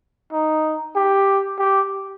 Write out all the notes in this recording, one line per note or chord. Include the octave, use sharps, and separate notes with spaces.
D#4
G4
G4